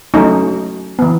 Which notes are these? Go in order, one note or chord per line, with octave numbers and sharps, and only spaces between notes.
F#3 A3 C#4 D#4
E3 B3